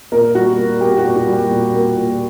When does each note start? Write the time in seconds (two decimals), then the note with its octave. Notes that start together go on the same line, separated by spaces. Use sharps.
0.12 A#2 A#4
0.35 G3 F#4
0.58 A#2
0.81 A#3 G4
0.98 F#4
1.04 A#2
1.16 F#4
1.27 G3
1.33 G4
1.50 A#2
1.73 A#3
1.96 A#2